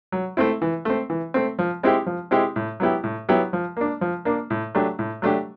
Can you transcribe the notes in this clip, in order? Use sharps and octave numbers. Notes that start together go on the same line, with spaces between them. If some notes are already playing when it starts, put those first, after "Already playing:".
F#3
A3 C4 E4
E3
A3 C4
E3
A3 C4
F3
G#3 C4 E4 G4
F3
G#3 C4 E4 G4
A2
F#3 B3 E4 G4
A2
F#3 B3 E4 G4
F3
A#3 D4
F3
A#3 D4
A2
F#3 A3 D4 G4
A2
F#3 A3 D4 G4